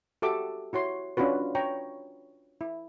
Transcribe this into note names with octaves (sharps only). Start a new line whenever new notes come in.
F#4 G4 A4 E5 D6
E4 F#4 C#5 C6
C#4 D4 F4 F#4 B4
C#5 G5 A#5 C#6
E4